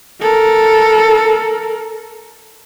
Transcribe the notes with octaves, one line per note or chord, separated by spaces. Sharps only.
A4 A#4